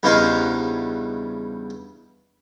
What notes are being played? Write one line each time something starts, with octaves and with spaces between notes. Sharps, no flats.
E2 G2 C#3 D#4 C5 F5